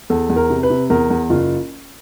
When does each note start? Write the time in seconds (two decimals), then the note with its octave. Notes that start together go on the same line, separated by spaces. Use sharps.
0.10 E2 A4
0.29 E2
0.36 A#4
0.50 C3
0.63 B4
0.70 C3
0.90 E2 A#4
1.10 E2
1.30 F#1 F4